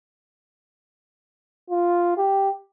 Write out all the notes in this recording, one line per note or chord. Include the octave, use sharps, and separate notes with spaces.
F4
G4